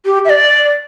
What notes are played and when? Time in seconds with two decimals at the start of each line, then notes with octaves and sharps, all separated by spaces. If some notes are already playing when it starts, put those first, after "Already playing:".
0.06 G4
0.25 E5
0.30 D5